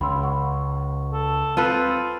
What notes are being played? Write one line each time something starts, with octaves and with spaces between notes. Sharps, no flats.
C#2 B5 C6 E6
F#5 C#6
A4
C4 F4 A4 B4 D#7